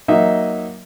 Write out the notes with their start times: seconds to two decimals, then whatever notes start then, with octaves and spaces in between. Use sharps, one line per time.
0.08 F#3 A#3 D#4 D#5 E5